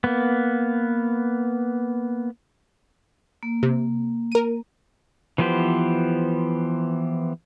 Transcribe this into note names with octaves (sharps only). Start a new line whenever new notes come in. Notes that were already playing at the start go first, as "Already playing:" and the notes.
A#3 B3
A#3
C3
A#4 D#7
E3 F3 B3 G4 C5